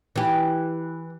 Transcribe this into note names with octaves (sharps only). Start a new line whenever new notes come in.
E3 G4